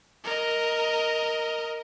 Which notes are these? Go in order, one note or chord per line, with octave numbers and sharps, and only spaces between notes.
A#4 D#5